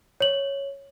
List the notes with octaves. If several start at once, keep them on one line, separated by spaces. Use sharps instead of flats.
C#5 F#7